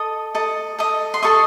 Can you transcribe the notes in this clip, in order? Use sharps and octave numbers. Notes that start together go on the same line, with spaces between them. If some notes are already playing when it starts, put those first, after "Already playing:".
Already playing: A4 D#5 D#6
A4 D#5
A4 D#5
C6
A4 D#5 C#6